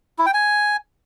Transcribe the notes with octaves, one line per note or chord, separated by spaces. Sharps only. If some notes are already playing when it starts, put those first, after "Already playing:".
E4
G5
G#5